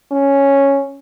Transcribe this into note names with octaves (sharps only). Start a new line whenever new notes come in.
C#4